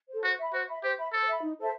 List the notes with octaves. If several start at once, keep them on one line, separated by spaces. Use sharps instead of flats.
A4 C5
F#4 C5
E5 B5
F#4 C5
E5 B5
G4 C5
E5 B5
A4 C5
E5 B5
D#4
A4 C5 E5